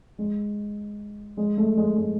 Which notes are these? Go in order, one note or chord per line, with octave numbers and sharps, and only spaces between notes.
G#3
G#3
A3
G#3
G#3